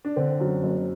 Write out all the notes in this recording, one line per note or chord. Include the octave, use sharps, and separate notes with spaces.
D4
D3 C4
F#2
F#1